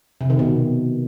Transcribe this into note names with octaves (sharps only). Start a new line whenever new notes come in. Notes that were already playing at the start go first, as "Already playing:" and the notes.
C3
D#3
B2